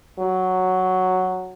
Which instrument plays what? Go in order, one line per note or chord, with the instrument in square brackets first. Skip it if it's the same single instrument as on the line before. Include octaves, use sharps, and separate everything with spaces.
[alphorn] F#3